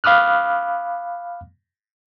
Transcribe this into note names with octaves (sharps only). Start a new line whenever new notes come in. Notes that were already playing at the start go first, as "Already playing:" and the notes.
F5 B5 D6 D#6 F6 F#6